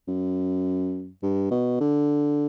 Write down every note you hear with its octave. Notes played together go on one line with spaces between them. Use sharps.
F#2
G2
B2
D3